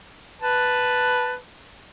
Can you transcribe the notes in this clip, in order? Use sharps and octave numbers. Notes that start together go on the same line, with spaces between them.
B4 A5